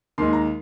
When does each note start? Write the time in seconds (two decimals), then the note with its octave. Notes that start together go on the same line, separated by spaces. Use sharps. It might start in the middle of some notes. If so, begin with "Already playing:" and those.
0.18 D#2 D#3 G#3 C6
0.33 A#5